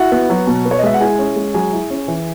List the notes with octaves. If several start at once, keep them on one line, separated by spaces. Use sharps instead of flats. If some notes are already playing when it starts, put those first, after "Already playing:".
Already playing: E4 F#4 F#5
B3
F#3
B2
B3
C#5
D#5
G#3 E5
F#5
E4 G#4 G#5
C#4
G#3
F#3 G#4 G#5
E4
C#4
E3